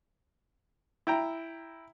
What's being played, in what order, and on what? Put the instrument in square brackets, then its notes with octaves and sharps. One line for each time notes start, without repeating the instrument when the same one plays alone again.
[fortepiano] E4 G5 A#5